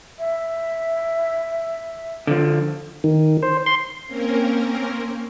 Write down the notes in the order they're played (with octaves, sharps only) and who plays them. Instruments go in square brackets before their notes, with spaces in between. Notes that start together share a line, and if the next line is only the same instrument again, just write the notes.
[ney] E5
[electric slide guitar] D3 F3
[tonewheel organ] D#3
C5
C6
[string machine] A#3 C4 C#4 A#4